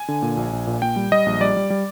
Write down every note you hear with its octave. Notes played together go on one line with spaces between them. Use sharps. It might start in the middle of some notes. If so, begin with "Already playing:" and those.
Already playing: G#5
D3
A#2
A#1
A#1
A#2
A#2 G5
G3
G3 D#5
A#1
G3 D5
G3
G3